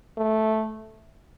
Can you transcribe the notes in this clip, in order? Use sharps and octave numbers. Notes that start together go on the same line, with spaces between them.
A3